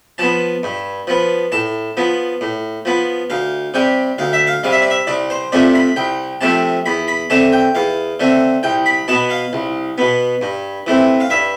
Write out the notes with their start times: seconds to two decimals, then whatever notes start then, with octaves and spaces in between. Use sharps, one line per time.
0.18 F3 B3 A5
0.63 G2
1.07 F3 B3
1.52 A2 A5
1.97 F3 B3
2.41 A2
2.85 F3 B3
3.30 D2 F5
3.74 C3 G3 G5
4.18 D2 F5
4.33 E5
4.47 F5
4.63 C3 G3 F5
4.72 E5
4.82 D5
4.90 E5
5.07 C2 D5
5.30 C5
5.52 C3 F3 A3 C4 D5
5.75 B5
5.96 C2 G5
6.41 C3 F3 A3 C4 A5
6.86 E2 B5
7.08 B5
7.30 D3 A3 C4 A5
7.52 G5
7.75 E2 F5
8.20 D3 A3 C4
8.63 C2 G5
8.86 B5
9.08 B2 B3 A5
9.30 F5
9.53 C2
9.98 B2 B3
10.42 G2
10.87 E3 A3 C4
11.20 F5
11.30 G2 E5